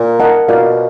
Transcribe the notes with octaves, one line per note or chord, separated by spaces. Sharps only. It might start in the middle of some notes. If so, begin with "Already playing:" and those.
Already playing: A#2
A#4 D#5 F#5 A5
B2 F4 A#4 D5 F5